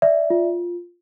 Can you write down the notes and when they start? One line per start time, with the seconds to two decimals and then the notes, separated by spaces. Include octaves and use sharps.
0.02 D5 E5
0.30 F4